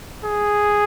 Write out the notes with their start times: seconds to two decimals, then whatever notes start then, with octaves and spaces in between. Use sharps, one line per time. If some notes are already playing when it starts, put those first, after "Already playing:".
0.25 G#4